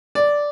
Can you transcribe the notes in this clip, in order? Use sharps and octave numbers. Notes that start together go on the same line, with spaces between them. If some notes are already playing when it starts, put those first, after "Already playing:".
D5